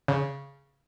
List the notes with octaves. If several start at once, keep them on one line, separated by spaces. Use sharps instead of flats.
C#3